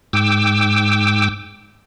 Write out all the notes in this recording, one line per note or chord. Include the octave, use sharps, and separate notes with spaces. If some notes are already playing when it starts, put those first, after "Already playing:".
G#2 G5 D6 E6